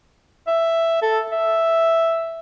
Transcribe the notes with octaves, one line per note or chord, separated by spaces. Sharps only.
E5
A4
E5